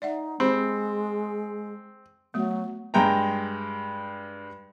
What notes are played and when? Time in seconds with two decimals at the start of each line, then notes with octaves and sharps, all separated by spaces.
0.02 D#4 D5 E5 F#5
0.40 G#3 C4 G4 C5 B5
2.34 F#3 A3 B3
2.94 G2 G#3 G5 A#5